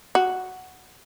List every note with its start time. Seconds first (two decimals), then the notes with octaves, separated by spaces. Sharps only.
0.15 F#4